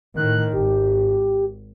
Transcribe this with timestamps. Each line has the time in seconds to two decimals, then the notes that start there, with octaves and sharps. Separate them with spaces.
0.16 A2 D#3 F#6
0.53 G#1 G4